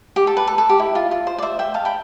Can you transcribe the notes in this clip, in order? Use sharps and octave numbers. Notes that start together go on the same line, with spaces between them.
G4
A4
B4
A4
A4
G4
E4
F4
F4
C5
D5
C5 E5
E5 G5
F5 A5
G5 B5